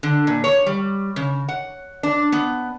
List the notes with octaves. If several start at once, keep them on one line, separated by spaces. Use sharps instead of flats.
D3
A#2
C#5
G3
C#3
F#5
D4
B3